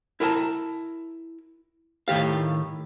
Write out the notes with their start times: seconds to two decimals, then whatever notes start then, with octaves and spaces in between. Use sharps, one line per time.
0.20 E4 A#4 G5 A5 A#5
2.08 A2 D#3 G4 F5